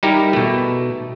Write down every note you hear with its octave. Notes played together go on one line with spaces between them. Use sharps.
G3 D#4 E4 G4 A#4
B2 A3